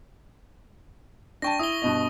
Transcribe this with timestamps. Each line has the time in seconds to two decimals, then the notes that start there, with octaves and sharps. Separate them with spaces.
1.42 D4 G5 A5 C#6 A#6
1.59 E4 D#6 G7
1.82 G2 B2 D#5